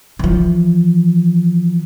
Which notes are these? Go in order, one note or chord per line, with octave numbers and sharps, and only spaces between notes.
E3 F3